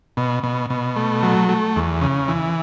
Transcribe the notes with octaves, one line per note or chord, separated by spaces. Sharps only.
B2
B2
B2
A3
F#3
A3
E2
C#3
E3